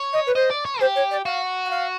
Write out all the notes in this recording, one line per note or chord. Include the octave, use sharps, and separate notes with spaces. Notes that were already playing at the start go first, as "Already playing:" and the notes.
Already playing: C#5
D#5
B4
C5 D#5
D5
C#5
G4 C5
C#5
D5
F#4 F5
F#5
F5